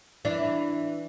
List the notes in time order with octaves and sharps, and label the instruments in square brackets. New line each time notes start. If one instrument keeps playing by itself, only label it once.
[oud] E3 D4